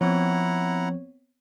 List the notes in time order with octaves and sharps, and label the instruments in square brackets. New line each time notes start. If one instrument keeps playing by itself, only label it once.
[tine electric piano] F3 [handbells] B3 C4 C#5 [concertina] E4 F#5 A#5